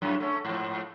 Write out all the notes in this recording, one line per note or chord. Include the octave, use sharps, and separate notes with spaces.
F#2 A2 F#3
A3 C#4
G#2 F3